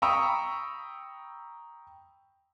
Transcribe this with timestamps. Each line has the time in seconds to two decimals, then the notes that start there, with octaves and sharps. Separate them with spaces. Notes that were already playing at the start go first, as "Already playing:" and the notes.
0.02 G5 A#5 B5 C#6 D#6 E6